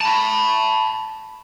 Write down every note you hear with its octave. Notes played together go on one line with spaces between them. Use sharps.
A5 B5